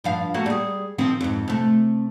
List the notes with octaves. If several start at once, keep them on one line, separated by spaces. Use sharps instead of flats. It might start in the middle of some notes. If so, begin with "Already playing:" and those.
G2 F3 F5
A3 A#3 F#4
G3 G#4
D#3 F3 C4
F2 G#2
C3 A3